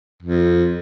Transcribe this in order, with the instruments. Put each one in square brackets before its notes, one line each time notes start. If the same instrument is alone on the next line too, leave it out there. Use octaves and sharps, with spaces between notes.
[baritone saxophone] F2